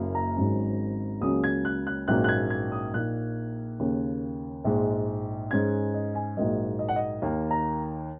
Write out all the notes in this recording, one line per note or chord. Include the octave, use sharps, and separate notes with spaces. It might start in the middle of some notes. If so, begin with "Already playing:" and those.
Already playing: F#1 F#2 C#3 F#3 A#3
A#5
G#1 G#2 F#3 C#4
C#2 C#3 F#3 A#3 C#4 D#6
G#6
F#6
F#6
A#1 G#2 F#3 A#3 C#4 F#6
F#6
G#6
G#6
D#6
A#1 A#2 A#3 D#4 F#6
D#2 C#3 A#3
A#1 G#2 G#3
G#2 G#3 C#4 G#6
D#5
G#5
A#1 G#2 F#3 A#3 D#5
D#5
F#5
D#5
D#2 D#3 A#3
A#5